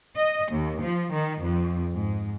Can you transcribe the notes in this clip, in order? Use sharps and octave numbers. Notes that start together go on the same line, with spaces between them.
D#5
D#2
F3
D#3
F2
G#2